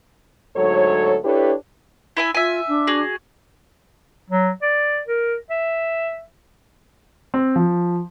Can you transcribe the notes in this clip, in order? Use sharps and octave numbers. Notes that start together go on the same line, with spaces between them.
D2 G#2 F#3 A4 C#5
D4 E4 G4 A4 B4 C#5
E4 E5 G#5
F4 E5 G#5
D4
F#4 G#4
F#3
D5
A#4
E5
C4
F3